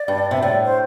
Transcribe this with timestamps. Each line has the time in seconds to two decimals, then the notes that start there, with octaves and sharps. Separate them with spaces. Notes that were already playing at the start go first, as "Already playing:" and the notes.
Already playing: D5
0.08 G2
0.31 C3 E5
0.42 A2 D5
0.65 C5